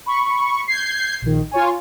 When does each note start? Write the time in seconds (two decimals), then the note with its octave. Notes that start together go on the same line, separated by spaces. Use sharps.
0.06 B5 C#6
0.67 G6 G#6 C7
1.22 A#1 D#3
1.51 F4 C#5 G#5